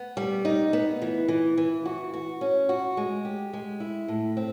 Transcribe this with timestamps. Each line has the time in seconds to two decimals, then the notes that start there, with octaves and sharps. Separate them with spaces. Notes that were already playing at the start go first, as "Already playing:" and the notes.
Already playing: B3
0.17 G3
0.45 D#4
0.73 B3
1.02 E3
1.28 E3
1.57 E3
1.86 F#4
2.14 F#4
2.41 C#4
2.69 F#4
2.97 G#3
3.25 G4
3.53 G#3
3.80 E4
4.08 A2
4.37 C4